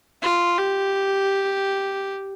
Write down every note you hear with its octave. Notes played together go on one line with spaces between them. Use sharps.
F4
G4